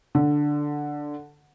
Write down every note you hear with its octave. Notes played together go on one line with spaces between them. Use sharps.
D3